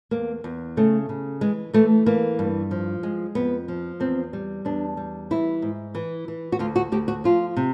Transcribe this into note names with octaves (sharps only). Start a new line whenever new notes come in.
E2 A#3
E2
C#3 A3
C#3
E3 G#3
E3 A3
E3 A#3
G2
F3
G#3
F2 B3
F3
E2 C4
G3
E2 D4
G3
E3 E4
G#2
E3
E3
F#4
D2 F4
F#4
D2 G4
F#4
F3 F4
C3